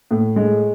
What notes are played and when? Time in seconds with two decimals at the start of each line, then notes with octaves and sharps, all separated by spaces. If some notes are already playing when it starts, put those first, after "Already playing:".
0.11 A2
0.36 G#3